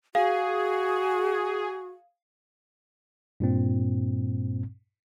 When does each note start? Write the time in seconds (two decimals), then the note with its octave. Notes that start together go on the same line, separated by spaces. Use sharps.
0.15 F#4 G#4 F5
3.40 G2 A#2 C4